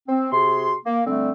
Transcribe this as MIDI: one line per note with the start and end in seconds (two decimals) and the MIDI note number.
0.08 0.28 60
0.32 0.75 48
0.32 0.75 66
0.32 0.75 68
0.32 0.75 84
0.86 1.02 58
1.07 1.31 50
1.07 1.31 55
1.07 1.31 57
1.07 1.31 60